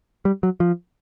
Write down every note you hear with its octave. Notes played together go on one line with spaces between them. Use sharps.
G3
F#3
F3